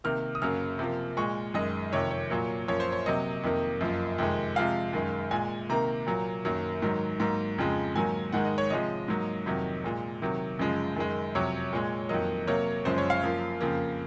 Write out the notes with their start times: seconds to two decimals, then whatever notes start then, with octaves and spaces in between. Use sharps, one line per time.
0.04 C3 D#3 A#3 F6
0.35 D#6
0.42 F#2 C#3 F#3 A#3 F6
0.79 C3 F3 A#3
1.17 A#2 G#3 C#6
1.54 F#2 D#3 G#3 D#5
1.92 F2 C3 D#3 C#5
2.11 C#5
2.30 A#2 F#3 A#3
2.68 F#2 F3 A#3 C#5
2.80 C5
2.92 C#5
3.06 C3 F#3 A#3 D#5
3.43 F2 C3 D#3 A#3
3.81 F#2 F3 A#3
4.18 F2 C3 D#3 G#3
4.56 C3 F3 G#3 F5
4.93 F#2 D#3 G#3
5.31 A#2 G#3 G#5
5.69 C3 D#3 A#3 A#5
6.07 A#2 F#3 A#3
6.45 F#2 D#3 F#3 A#3
6.82 G#2 D#3 F#3
7.20 G#2 F#3 A#3 A#5
7.58 F2 C#3 F3 G#3
7.95 G#2 D#3 F#3 A#3 G#5
8.32 G#2 D#3 G#3 F#5
8.45 D#5
8.58 C#5
8.70 C3 F3 G#3 D#5
9.08 G#2 F#3 A#3
9.46 F2 C3 D#3 F#3
9.84 A#2 G#3
10.22 C3 D#3 F#3
10.59 F#2 C#3 F3 G#3
10.96 F#2 D#3 G#3
11.35 F2 C3 F#3 C#5
11.73 A#2 G#3
12.09 F2 D#3 F#3 A#3 D#5
12.47 C3 F#3 A#3 C#5
12.85 F#2 C#3 F3 G#3 C5
12.98 C#5
13.10 F5
13.23 F#2 F3 A#3
13.61 F2 C#3 F3 A#3